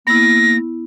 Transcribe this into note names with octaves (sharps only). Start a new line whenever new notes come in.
A#3 B3 E4 A#6